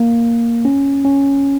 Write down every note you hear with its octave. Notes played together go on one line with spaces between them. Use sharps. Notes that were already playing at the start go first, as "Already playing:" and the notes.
Already playing: A#3
C#4
C#4